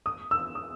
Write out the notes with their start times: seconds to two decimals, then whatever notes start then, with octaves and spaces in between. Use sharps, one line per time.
0.06 D#6
0.31 E6
0.55 D#6